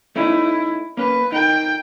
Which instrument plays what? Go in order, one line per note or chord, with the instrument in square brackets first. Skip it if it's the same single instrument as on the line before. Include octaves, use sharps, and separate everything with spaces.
[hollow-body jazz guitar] A3 C#4 D#4 [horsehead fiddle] E4
[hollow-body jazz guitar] A#3 C#4 [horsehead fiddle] B4
[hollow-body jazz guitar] D#4 A#4 [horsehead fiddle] G5